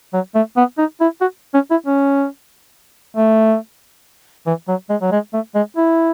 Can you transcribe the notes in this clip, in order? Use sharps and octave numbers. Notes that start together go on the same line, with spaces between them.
F#3
A3
B3
D#4
E4
F#4
C#4
E4
C#4
A3
E3
F#3
G#3
F#3
G#3
A3
G#3
E4